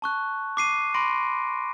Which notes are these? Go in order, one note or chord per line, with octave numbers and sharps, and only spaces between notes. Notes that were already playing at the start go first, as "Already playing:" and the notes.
A5 C#6 F#6
D6 C7 D#7
B5 C6 A#6 D7